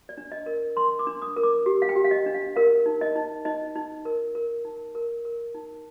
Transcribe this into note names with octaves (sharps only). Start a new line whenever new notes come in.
D5
D4
D#5
A#4
A#4 C6
D6
D4
D#6
A#4
D6
G4
F5
G5
G4
F5
D#5
D4
F5
A#4 F5
D#4
D#5
D#4
D#4 D#5
D#4
A#4
A#4
D#4
A#4
A#4
D#4